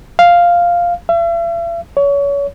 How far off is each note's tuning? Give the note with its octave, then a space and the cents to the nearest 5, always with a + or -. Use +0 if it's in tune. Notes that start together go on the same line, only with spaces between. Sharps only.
F5 +0
E5 +45
C#5 +30